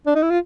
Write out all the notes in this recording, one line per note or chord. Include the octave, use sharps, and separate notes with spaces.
D4
D#4
E4
F4